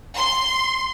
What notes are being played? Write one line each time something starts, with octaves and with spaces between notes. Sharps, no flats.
C6